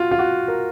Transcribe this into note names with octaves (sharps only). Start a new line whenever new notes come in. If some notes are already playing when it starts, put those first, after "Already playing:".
Already playing: F4 F#4
F4
F#4
A#4